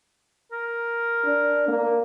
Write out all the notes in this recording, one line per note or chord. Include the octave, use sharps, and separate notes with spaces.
A#4
D4
A#3